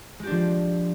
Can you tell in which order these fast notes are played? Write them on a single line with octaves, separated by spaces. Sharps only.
G#3 G4 D4 F3